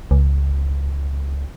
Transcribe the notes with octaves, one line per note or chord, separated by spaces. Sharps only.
C#2